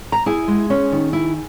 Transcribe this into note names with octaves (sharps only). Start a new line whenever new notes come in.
A#5
E4 G#4 G#5
G#3
C#4
D#3
E4